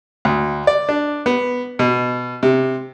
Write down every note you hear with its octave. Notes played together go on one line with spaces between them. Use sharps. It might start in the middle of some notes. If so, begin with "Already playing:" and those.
D2
D5
D4
B3
B2
C3